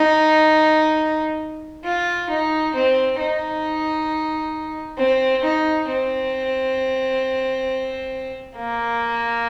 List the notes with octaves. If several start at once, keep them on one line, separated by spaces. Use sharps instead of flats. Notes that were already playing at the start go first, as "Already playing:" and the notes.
Already playing: D#4
F4
D#4
C4
D#4
C4
D#4
C4
A#3